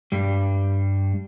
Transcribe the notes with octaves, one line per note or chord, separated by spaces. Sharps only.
G2 G3 D4